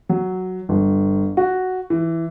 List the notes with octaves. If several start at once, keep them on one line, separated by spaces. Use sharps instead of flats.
F#3
G1
F#4
E3